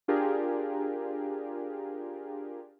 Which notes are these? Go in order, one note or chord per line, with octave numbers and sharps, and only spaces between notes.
D4 F4 G4 G#4 A#4